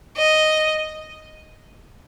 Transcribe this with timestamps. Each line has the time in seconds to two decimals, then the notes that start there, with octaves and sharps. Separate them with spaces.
0.18 D#5